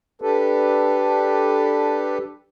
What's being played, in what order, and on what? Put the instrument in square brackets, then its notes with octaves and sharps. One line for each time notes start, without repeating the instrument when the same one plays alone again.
[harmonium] D4 G4 A4 B4